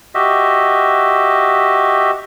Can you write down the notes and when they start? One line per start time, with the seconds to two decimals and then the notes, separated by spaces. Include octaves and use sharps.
0.15 F#4 G4 D#5 E5